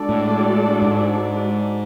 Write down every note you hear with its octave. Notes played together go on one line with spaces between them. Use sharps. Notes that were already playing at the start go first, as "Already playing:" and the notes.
Already playing: G#3 D4 F#4 A4 D5
A2
G#2